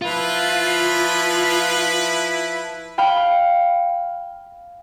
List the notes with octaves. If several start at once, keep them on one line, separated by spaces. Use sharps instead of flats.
F3 E4 F4 B4
F5 G5 B5 F6